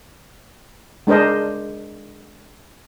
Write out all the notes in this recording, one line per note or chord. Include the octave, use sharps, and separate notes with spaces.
G#3 D4 A#4 C5 D#5